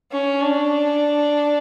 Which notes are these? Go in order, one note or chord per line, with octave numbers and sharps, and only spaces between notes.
C#4
D4